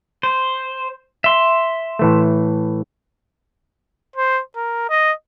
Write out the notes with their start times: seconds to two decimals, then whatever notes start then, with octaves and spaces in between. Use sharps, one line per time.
0.23 C5
1.24 E5 C6
1.99 A2 E3 A3
4.16 C5
4.56 A#4
4.89 D#5